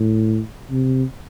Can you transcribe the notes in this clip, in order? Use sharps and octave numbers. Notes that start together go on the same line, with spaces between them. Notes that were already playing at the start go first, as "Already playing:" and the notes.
Already playing: A2
C3